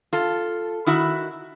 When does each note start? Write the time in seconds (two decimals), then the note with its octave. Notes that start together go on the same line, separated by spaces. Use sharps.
0.13 F4 A4
0.86 D#3 E4 F#4